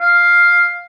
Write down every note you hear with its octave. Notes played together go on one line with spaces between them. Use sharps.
F5